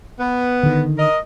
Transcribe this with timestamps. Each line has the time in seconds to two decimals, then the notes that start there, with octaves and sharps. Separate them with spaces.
0.20 B3
0.63 D3 D#3
0.98 A#4 D#5